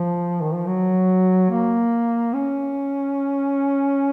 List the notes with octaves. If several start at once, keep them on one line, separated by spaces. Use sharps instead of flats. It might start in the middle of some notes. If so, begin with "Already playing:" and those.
Already playing: F3
D#3
F3
F#3
A#3
C#4